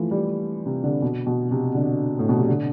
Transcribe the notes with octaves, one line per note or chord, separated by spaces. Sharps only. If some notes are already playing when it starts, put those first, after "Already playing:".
Already playing: E3 F3 A3
G3
C3
D3
B2
B2
C3
D3
A2
B2
C3
D3